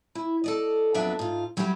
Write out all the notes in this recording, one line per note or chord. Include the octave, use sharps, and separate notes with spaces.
E4
A4 D5 D#5
F2 F#3 B3 D4 E5
G#2 F4
F#3 G3 C#4 E4 F#4 G4